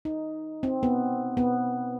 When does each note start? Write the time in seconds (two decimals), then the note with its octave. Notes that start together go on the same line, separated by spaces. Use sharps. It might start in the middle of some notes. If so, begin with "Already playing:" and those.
0.05 D#4
0.63 C4
0.83 B3
1.37 B3